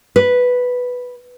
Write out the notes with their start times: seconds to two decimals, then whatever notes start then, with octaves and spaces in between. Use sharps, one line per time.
0.16 B4